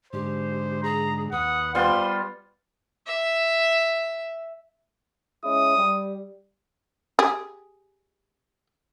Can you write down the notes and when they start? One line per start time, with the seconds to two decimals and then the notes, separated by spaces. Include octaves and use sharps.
0.13 G#2 D3 G4 C5
0.83 G#4 A#5
1.32 D#2 B4 F#5 D#6
1.75 G3 B3 F4 C5 C6
3.07 E5
5.44 G#3 C#4 E4 D#6
5.77 G3
7.19 G4 G#4